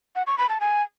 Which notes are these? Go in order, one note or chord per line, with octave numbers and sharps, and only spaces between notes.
F#5
C#6
B5
A5
G#5